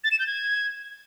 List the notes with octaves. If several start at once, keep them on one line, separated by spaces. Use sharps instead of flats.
A6
E7
G6
G#6